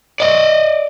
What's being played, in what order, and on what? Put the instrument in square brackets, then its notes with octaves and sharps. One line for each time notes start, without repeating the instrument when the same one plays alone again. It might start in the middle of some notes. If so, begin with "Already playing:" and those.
[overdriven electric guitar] D5 D#5